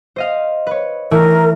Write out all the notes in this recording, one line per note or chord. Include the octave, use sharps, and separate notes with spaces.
C5 D#5 F5
B4 C#5
E3 A3 E4 A#4